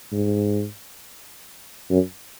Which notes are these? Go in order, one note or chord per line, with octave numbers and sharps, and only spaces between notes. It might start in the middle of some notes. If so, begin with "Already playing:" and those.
G#2
F#2